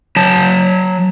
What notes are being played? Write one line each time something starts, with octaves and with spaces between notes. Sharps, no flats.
F#3 A5